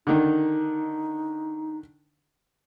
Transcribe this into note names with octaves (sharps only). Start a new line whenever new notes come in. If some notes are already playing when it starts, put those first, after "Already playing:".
D3 D#3 D#4